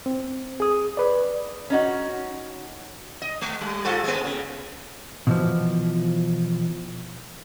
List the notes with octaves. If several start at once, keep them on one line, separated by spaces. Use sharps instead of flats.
C4
G#4 D#6
B4 D5
C#4 D#4 F#4
D#5
G#3
G3
G#2 F4 A4
G#3 A#3
C#3
B2 E3 F3